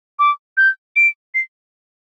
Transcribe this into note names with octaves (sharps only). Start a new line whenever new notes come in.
D6
G6
D7
C7